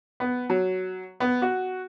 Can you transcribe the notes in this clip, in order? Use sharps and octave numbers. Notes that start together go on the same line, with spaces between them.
B3
F#3
B3
F#4